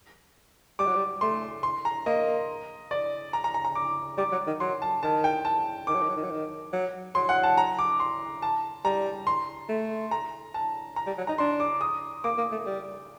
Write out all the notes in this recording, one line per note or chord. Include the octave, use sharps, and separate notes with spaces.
G3 D6
F#3
G3
A3 C6
C6
A#5
A#3 D#5
D5
A#5
A#5
A#5
A#5
D6
G3 D6
F#3
D#3
F#3 C6
A5
D#3 A5
G5
A5
D#3 D6
F#3
D#3
F#3
D#3
F#3
D#3
F#3
F#3 C6
F#5
A5
A#5
D6
C6
A5
G3 A#5
C6
A3
A#5
A5
A#5
G3
F#3
D#4 A#5
D4 C6
D6
D#6
A#3 D6
A#3
A3
G3